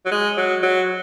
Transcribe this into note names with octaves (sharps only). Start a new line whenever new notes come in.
F#3
G#3
F#3
F#3